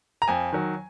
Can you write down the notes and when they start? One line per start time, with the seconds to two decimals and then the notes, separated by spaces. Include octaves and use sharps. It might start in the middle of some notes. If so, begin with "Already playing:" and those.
0.22 A#5
0.28 F2 G#5
0.53 D#3 F#3